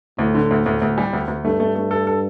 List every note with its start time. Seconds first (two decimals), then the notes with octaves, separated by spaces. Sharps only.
0.18 D2 A2
0.35 D3
0.51 D2
0.66 D2
0.82 D2
0.98 G3
1.13 D2
1.28 D2
1.45 G2 A3
1.60 A3
1.75 A3
1.91 A4
2.07 A4